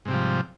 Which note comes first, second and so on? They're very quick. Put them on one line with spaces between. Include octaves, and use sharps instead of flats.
G#2 C3 G3 F3